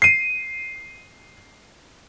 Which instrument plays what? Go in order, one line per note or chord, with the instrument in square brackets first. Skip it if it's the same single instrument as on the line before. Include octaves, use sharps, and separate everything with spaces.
[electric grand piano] C7 D#7